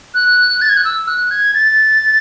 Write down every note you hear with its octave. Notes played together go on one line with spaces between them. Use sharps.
F#6
A6
G#6
F#6
E6
F#6
G#6
A6